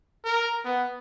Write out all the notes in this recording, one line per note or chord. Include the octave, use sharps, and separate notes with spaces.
A#4
B3